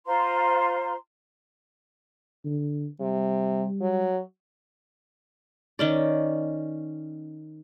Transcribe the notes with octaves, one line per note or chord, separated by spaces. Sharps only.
F4 C5 A#5 C6
D3
C3 G3
F#3
D#3 C#4 D5